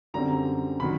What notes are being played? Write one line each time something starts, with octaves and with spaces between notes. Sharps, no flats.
F#2 D3 G3 C4 A#5
D#3 F#3 B5